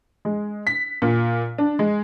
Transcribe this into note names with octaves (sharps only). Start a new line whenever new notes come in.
G#3
B6
A#2
D4
G#3